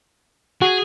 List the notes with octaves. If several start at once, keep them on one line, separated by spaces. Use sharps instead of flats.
F#4 G#4